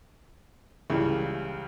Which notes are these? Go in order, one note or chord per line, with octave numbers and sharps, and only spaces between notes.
C#2 C#3 E3 G3